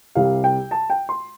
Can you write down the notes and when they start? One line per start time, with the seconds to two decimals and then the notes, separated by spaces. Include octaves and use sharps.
0.15 C2 C3 G3 F5
0.44 G5
0.71 A5
0.90 G5
1.09 C6